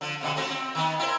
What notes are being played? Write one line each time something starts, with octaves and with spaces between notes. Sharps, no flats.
D3 F3
F2 B2 D3
A3 C4 F#4
C4
D#3 B3
E4 A#4 C5